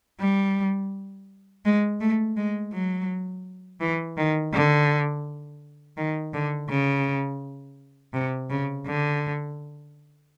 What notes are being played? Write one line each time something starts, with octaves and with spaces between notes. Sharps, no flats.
G3
G#3
A3
G#3
F#3
E3
D#3
D3
D#3
D3
C#3
C3
C#3
D3